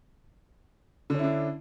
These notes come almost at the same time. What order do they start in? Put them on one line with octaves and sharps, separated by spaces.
D3 C#4 E4 D4